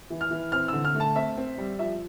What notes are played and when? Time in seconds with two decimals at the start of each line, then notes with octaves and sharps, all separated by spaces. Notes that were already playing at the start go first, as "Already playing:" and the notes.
0.10 E3
0.21 F6
0.31 E3
0.52 C4 F6
0.68 D3 E6
0.85 F6
0.95 A3
1.00 A5
1.15 C4 E5
1.37 C4
1.58 G3
1.79 F3 E5